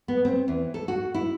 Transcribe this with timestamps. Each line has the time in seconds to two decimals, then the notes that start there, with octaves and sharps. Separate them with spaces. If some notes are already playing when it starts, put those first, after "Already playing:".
0.08 B3
0.25 C4
0.48 E2
0.74 A4
0.88 F#4
1.14 E4